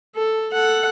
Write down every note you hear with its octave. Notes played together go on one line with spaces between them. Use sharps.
A4
A4 F#5